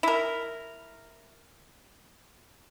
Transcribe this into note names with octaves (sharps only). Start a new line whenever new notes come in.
E4 A#4